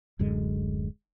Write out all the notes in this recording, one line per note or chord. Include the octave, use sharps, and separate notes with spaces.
D1 F#2 D3 G#3